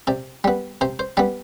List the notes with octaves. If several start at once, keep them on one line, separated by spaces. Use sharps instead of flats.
C3 D5
G3 B3
C3 C5
C5
G3 B3 D5